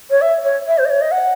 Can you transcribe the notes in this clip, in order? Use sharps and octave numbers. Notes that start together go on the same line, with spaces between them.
C#5
E5
C#5
E5
C5
D#5
C#5
D#5
F#5